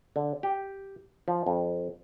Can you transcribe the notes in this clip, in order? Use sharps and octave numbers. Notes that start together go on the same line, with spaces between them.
D3
G4
F3
F2